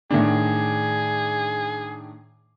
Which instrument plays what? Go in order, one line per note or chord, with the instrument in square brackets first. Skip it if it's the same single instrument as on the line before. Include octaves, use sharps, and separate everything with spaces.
[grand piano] A2 D#3 D4 [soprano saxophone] G#4